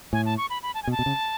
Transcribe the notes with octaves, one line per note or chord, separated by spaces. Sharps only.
A2 G#5
A5
C#6
B5
B5
A5
G#5
B2
A5
B2
C#3